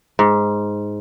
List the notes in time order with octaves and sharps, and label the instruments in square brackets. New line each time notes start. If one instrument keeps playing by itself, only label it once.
[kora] G#2